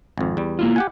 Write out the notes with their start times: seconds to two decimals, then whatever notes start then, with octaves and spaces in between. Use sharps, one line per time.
0.18 G#1 F2
0.37 E2 G3
0.59 A#3 E4 F4
0.76 G4 F#5 G#5